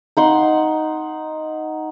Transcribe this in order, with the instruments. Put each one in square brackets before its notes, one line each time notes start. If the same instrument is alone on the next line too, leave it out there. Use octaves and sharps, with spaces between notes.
[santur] D#4 F#5 C6